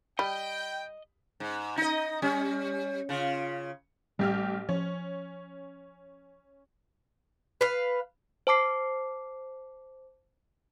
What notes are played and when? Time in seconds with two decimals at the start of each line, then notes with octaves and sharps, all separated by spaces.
0.19 G3 D#5 G5 B5
1.40 G#2
1.77 D#4 D#5
2.22 G3 C#4
3.09 C#3 F4
4.19 A1 G3 G4 F6
4.69 F3 C#4
7.61 B4 F5
8.47 C5 A5 D6 C7